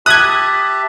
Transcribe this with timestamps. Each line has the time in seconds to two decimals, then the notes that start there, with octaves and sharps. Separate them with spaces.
0.06 G4 E5 A5 D#6 F#6 G#6 F#7